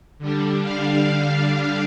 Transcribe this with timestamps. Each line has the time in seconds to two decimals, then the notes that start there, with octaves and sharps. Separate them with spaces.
0.18 D3 G3 D4
0.63 F5